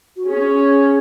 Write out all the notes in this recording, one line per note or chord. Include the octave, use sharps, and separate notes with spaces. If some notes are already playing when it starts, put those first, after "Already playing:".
F#4
C#4 G#4